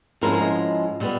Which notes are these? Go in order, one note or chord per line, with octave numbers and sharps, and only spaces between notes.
G#2 F3 G#3 C#4 E4 A#4
D#5
A#2 G3 B3